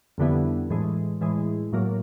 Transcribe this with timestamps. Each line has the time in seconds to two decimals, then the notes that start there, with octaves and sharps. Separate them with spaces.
0.18 F2 D3 G3 B3 E4
0.70 A2 E3 G#3
1.21 A2 E3 G#3
1.73 A2 F#3 A#3